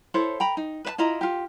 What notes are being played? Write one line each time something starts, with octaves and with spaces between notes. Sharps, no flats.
E4 A4 C5 C#5
G5 A#5 B5
D#4
B4 E5 A5
E4 F4 D#5 A#5
F4 G4